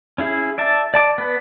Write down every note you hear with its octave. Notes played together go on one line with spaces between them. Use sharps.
C#4 E4 G#4
D5 E5 A5
D5 A5 D6
B3 B4